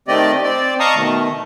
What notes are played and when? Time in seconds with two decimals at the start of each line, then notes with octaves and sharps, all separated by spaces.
0.08 D#3 A3 C4 G4 D5 D#5
0.43 C4 D5
0.80 D#5 F5 A5 A#5 C#6 D#6
0.95 B2 D#3 A3